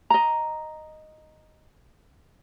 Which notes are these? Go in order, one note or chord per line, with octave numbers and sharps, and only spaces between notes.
D#5 A#5